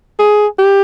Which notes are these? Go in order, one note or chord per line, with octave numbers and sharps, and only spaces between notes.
G#4
G4